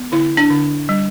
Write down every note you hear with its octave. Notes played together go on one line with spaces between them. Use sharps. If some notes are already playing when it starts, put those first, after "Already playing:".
Already playing: B3
D3 E4
D4
D3
G3